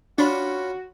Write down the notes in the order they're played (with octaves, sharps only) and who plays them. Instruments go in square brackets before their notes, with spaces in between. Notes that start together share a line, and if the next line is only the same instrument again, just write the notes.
[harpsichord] C#4 F4 B5 [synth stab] D4 [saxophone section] F#4